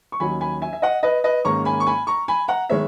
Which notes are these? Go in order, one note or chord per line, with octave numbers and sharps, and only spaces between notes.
C#6
D#2 D#3 F#3 C#4 G#5 B5
G#5 B5
E5 G#5
E5
D#5 F#5
B4 D#5
B4 D#5
G#2 D#3 A#3 C#4 A#5 C#6
G#5 B5
C#6
G#5 B5
A#5 C#6
G#5 B5
F#5 A#5
D#3 G#3 B3 C#5 E5